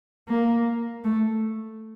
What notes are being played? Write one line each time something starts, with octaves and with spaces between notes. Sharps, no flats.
A#3
A3